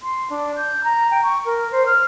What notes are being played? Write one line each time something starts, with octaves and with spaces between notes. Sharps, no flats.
C6
D4
G6
A#5
G5
C#6
A#4
C5
F6